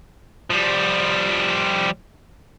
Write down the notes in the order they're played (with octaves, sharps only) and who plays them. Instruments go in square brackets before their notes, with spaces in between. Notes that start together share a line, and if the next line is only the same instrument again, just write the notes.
[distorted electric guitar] F3 G3